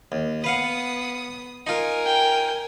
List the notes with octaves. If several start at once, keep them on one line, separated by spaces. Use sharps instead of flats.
D#2
B3 B4 F5 F#5 D#6
D#4 F4 A#4 G#5
G5